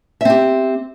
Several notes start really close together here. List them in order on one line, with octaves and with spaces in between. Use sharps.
E5 C4 G4